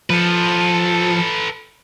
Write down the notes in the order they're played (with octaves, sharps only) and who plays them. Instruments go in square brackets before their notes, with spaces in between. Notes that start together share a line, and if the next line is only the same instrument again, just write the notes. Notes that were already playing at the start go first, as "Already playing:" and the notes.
[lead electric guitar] F3 [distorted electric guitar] A4 B4